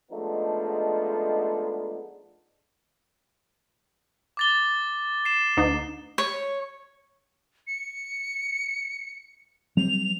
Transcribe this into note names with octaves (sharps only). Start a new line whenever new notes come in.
F3 G#3 A3 B3 D4 D#4
D6 A6 G7
C7 E7
D2 D#4
C#5
C#7
F#3 G3 C4 F7